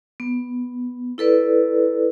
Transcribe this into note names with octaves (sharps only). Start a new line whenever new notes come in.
B3
E4 A4 B4 D5